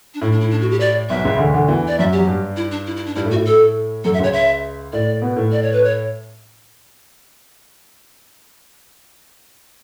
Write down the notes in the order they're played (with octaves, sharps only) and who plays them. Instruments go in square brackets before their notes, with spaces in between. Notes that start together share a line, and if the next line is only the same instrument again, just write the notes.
[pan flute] D4
[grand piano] A2 [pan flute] E4
[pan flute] D4
E4
D4
F#4
G4
D5
[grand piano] B1 B2 [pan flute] E5
[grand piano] C#2 C#3
D2 D3
D2 D3
E2 E3
[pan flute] D5
[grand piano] F#2 F#3 [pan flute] E5
[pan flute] G4
[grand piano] F#3
G2 G3
[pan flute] E4
D4
E4
E4
D4
[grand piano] G2 G3 [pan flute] E4
[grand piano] A2 A3
[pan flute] F#4
[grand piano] A2 A3
[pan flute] A4
[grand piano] F#2 F#3 [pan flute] A4
[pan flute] E5
[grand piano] C#2 C#3 [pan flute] C#5
[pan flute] E5
[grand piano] A2 A3 [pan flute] D5
[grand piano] B2 B3
A2 A3
[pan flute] D5
C#5
B4
C#5